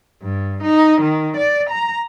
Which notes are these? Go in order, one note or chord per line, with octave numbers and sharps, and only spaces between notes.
G2
D#4
D#3
D5
A#5